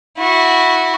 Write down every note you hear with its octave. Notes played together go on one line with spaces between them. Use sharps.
E4 F#4